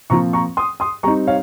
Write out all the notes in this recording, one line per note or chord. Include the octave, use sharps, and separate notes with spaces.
A#2 F3 C4 F4 A#5 C#6
A#5 C#6
C6 D#6
C6 D#6
G3 C4 D#4 A#5 C#6
C#5 F5